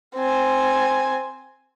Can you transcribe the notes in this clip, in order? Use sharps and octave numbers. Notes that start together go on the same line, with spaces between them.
C4 G#5